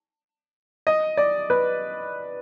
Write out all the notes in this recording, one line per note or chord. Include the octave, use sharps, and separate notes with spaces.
D#5
D5
B4